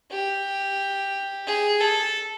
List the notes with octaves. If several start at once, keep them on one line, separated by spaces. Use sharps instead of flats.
G4
G#4
A4